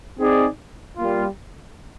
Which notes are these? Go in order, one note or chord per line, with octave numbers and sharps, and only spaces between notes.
C4 D#4 G#4 D5
G3 A#3 F4